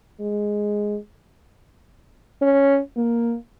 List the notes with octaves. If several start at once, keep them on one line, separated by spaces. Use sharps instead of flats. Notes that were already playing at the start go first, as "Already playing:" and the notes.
G#3
C#4
A#3